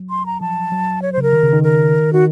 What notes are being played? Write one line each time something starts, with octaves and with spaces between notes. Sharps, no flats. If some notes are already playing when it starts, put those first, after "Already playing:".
Already playing: F#3
C6
A#5
F3 A5
F#3
C#5
C5
C#3 A#4
D#3
C#3
D#3
A#4
D#3 F#4